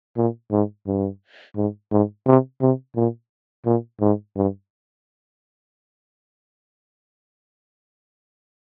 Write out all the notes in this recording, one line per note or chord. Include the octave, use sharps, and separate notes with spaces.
A#2
G#2
G2
G#2
G#2
C3
C3
A#2
A#2
G#2
G2